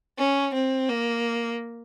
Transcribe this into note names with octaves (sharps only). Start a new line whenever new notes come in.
C#4
C4
A#3